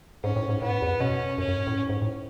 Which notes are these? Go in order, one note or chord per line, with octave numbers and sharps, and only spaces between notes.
G#2 C#4
A2
G#2
A2 B3
G#2
E2
F#2
B2 C#4
F#2 C#4
F#2
G#2
A2
G#2
A2